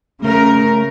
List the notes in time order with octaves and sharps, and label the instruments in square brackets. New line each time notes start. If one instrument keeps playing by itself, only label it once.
[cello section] C#3 A#4 [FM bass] A3